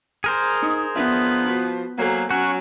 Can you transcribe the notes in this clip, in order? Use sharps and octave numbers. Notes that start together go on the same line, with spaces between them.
G#4 A#4 C5
D#4
F3 B3 D4 E5
F#4
F#3 A#3 A4 C5 G#5
F#3 C#4 F#4